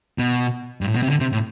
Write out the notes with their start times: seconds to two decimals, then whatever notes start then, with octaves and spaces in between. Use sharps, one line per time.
0.18 B2
0.81 G2
0.88 A2
0.95 B2
1.03 C3
1.10 D3
1.20 C3
1.33 A2